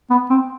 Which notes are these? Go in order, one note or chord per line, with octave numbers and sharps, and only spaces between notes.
B3
C4